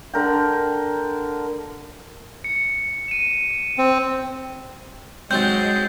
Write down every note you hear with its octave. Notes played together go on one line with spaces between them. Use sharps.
D3 A#4 G5
C#7
D#7 E7
C4
G#2 F#3 G#3 C4 G6 A6